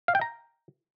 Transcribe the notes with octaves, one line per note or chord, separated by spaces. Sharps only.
F5
G5
A#5